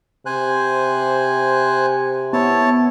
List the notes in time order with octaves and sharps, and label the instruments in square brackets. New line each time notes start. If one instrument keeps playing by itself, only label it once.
[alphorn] C3 [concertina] C5 G#5 F#6
[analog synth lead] B3 [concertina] E4 C#5 A5